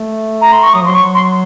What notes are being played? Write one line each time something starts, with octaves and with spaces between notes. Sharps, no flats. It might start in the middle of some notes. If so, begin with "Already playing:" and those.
Already playing: A3
A#5
C6
C#6
F#3 D#6
F3
F#3 C6
C#6
C6